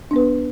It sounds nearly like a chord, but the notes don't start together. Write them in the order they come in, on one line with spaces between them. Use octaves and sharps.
D4 B3 B4